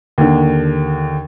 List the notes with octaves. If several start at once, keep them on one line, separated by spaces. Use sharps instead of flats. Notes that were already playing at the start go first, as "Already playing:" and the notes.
D#2 D3